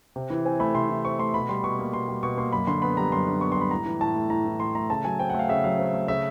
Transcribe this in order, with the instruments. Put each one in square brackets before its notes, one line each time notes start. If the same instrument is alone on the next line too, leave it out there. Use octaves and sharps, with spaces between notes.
[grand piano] C3
E3
C4 G#5
A3 B5
C3 C6
E3
C4 C#6
A3 C6
B2 B5
G3 C6
B2 C#6
A#3
B2 C6
G3
B2 C#6
A#3 C6
F#2 B5
D3 C6
B3 B5
G3 A#5
F#2 C6
D3
B3 C#6
C6
G3 B5
A2 A#5
E3
A2 A5
A3
A2 A#5
E3
A2 C6
A3 A#5
C#3 A5
F#3 G#5
C4 G5
F#5
A3 F5
C#3 E5
F#3 F5
C4
A3
C#3 E5